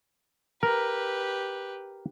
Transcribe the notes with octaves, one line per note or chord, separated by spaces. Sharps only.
G4 A#4 B4